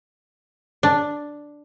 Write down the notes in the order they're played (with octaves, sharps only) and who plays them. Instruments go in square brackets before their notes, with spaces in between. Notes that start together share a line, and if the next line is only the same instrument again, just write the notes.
[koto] D4